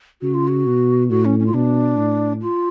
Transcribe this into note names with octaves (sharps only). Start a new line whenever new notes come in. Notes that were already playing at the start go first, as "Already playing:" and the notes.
C#3 F#4
F4
F#4
B2
A2 F#4
C#4
C#4
F4
B2 D4
A2
F4